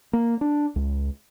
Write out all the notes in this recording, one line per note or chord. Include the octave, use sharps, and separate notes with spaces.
A#3
D4
C#2